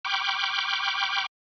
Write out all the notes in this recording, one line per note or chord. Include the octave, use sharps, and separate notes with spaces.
G5 B5 C#6 D6 F6 G6